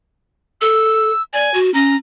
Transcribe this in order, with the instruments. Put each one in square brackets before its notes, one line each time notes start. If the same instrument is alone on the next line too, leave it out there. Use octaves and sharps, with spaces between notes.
[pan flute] A4 [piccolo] E6
[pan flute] D5 [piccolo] G#5
[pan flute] F#4
[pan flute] C#4 [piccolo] A#5